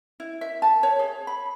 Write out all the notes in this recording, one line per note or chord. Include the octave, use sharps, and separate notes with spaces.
E4
E5
A5
C#5
G#4
B5